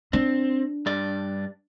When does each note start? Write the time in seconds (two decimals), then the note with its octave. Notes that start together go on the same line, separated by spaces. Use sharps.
0.13 C4 D4
0.86 G2 D5